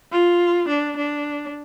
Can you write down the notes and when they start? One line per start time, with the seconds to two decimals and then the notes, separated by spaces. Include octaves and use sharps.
0.12 F4
0.68 D4
0.97 D4